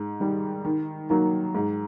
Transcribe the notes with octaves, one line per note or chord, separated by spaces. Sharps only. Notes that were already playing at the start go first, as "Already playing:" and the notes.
Already playing: G#2
D#3 G3
D#3
F#3 A#3 D#4
G#2